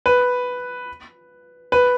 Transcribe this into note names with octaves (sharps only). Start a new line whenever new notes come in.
B4
B4